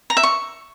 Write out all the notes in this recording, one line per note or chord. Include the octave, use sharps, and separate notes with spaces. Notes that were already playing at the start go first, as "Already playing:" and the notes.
A#5
E5
C#6